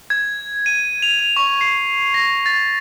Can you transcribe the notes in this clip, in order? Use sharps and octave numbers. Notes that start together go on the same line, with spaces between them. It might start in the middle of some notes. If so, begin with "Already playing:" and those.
G#6
D#7
F7
F7
C#6
C7
A#6
A6